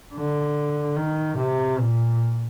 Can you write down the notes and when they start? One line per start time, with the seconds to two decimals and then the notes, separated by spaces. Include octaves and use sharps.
0.15 D3
0.96 D#3
1.38 C3
1.79 A#2